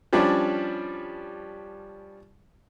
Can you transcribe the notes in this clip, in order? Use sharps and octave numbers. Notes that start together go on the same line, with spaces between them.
F3 G3 C#4 D4